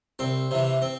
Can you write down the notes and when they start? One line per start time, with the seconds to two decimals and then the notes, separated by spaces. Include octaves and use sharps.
0.19 C2 C4
0.51 C3 E3
0.82 C4